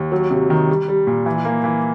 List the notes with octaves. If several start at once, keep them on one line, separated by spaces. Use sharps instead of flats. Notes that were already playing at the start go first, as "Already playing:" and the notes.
Already playing: D#2
F#3
C3
D#3
G3
G3
A#2
E3
A#3
E3